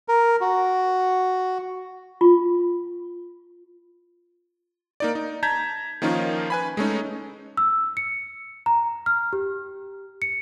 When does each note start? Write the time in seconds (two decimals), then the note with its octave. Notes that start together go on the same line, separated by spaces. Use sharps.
0.08 A#4
0.41 F#4
2.21 F4
5.00 A#3 D#4 D5
5.15 D#4
5.43 A5 A#5 G6 G#6 B6
6.02 D#3 F3 A#3 C#4 D#4 F4
6.50 B4 G#5 B5
6.77 G#3 A3 C#4 D#4
7.57 E6
7.97 C#7
8.66 A#5
9.06 F6
9.33 G4
10.22 C#7